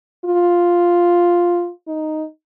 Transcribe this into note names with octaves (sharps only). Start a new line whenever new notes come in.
F4
D#4